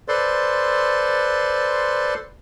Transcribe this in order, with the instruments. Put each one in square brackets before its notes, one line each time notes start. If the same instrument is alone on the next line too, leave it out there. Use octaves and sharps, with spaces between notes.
[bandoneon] A4 B4 C5 D5 C6